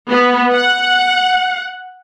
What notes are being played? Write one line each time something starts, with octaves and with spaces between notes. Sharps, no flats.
B3
F#5